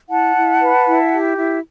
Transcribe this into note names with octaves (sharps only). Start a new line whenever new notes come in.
E4 F#5 A5
E4
B4
E4
G4
E4